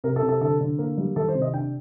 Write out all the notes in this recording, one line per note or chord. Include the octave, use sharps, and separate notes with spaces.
C3 A#4
A4
C3
A4
D3 A4
D3
A#3 A#4
G3
D#3 A4
C5
C3
D#5
D4 G5